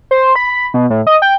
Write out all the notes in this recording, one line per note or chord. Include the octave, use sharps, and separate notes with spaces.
C5
B5
B2
A2
D#5
G5